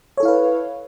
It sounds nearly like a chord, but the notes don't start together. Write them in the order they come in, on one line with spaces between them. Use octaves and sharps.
C#5 A4 E4 F5 B4